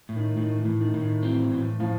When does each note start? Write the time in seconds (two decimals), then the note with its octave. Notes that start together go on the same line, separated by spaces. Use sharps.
0.09 A2
0.16 D#3
0.37 A2 D#3
0.59 E3
0.65 A2
0.80 D#3
0.94 A2
1.02 D#3
1.23 E3 C4
1.52 A2 E3
1.80 A2 F3